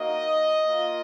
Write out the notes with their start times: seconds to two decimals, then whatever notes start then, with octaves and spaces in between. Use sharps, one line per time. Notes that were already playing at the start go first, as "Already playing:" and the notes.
Already playing: A#3 D#4 F#4 D#5
0.65 A#3 F4